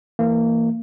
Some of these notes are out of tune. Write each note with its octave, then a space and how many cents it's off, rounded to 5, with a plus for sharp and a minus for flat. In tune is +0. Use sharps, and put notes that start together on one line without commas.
E3 +0 A#3 -25